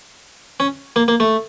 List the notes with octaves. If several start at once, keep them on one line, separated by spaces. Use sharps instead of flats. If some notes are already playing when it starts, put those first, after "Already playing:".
C#4
A#3
A#3
A3